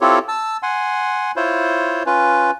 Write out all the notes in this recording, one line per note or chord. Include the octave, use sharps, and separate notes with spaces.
C4 E4 F4 G4 A4 C#5
A5 E6
F#5 G#5 C6
E4 F4 C5 C#5
C#4 F4 B4